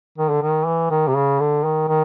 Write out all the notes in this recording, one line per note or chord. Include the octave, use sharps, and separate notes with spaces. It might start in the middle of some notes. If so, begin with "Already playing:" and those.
D#3
D3
D#3
E3
D#3
C3
C#3
D3
D#3
D#3